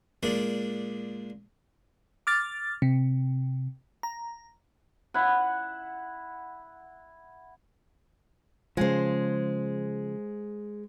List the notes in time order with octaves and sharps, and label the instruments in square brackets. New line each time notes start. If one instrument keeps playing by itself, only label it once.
[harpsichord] A#2 G#3 D4
[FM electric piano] D6 F6 A6
C3
A#5
[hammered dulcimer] E4 F#5
[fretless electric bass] C#3 F3 [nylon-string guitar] G#3 C5